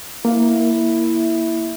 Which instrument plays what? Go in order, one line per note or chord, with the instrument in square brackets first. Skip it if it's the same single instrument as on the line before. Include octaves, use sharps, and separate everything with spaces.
[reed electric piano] A#3 [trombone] E4